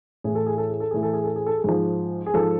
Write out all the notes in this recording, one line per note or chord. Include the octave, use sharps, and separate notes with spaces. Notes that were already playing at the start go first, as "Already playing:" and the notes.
A2 E3 G#4
A4
G#4
A4
G#4
A4
A2 E3 G#4
A4
G#4
A4
G#4
A4
G#4
G#2 F3
G#4
G#2 F3 A4